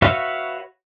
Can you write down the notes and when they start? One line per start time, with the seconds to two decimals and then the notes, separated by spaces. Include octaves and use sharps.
0.02 F#4 B4 C#5 E5 F5